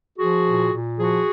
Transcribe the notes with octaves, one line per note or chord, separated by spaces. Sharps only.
F3 F#4 G#4
A#2
A#2
F3 F#4 G#4